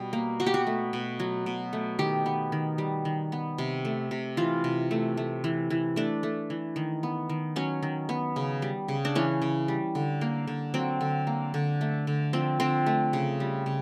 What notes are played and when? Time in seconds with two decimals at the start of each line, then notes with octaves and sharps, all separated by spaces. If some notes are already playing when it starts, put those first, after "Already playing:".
Already playing: B2 G3
0.13 A#3
0.40 B2 F#4
0.46 G4
0.54 F#4
0.67 A3
0.93 B2
1.20 F#3
1.46 B2
1.73 A3
1.99 D#3 G4
2.26 B3
2.52 D#3
2.78 G3
3.05 D#3
3.32 B3
3.58 C3
3.85 A3
4.11 C3
4.37 E3 F4
4.64 C3
4.91 A3
5.17 A3
5.44 E3
5.70 E3
5.96 A3 D4
6.23 A3
6.50 E3
6.76 D#3
7.03 B3
7.29 D#3
7.56 F#3 C#4
7.83 D#3
8.09 B3
8.36 C#3
8.62 G3
8.88 C#3
9.05 D4
9.15 E3 C#4
9.42 C#3
9.68 G3
9.95 D3
10.21 A#3
10.47 D3
10.74 F#3 C4
11.01 D3
11.27 A#3
11.54 D3
11.81 A3
12.07 D3
12.33 F3 C4
12.60 D3 C4
12.86 A3
13.13 C#3
13.40 G3
13.66 C#3